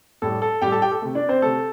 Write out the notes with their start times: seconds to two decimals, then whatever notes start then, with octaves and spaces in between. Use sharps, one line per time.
0.22 A2 G3 A4
0.42 A4
0.62 A2 G3 G4 G5
0.72 A4 A5
0.82 G4 G5
0.91 A4
1.02 C3 A3
1.15 D4 D5
1.29 C4 C5
1.42 C3 A3 A4